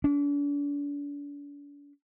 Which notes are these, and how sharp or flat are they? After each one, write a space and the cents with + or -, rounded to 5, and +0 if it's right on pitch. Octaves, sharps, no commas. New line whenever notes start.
D4 -40